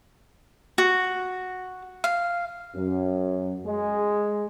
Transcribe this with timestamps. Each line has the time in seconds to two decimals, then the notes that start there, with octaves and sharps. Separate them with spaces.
0.78 F#4
2.04 F5
2.75 F#2
3.66 G#3